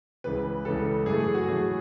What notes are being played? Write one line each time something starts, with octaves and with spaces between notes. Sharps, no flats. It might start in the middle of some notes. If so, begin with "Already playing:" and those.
C#2 C#3 E3 B4
C#2 C#3 E3 A4
F#2 E3 A3 G#4
G#4
F#4
F#2 E3 A3 G#4